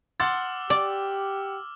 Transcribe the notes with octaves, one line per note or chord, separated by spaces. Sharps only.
F#5 C6 D6 E6 F6 A6
G4 D5